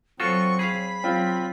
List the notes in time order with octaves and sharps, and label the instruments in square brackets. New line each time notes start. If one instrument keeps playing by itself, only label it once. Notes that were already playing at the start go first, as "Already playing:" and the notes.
[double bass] F#3 C4 [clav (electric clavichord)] F4 F#4 A4 [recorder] C#6
[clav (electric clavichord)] G#4 F5 [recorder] B5
[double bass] F#3 [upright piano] C4 F4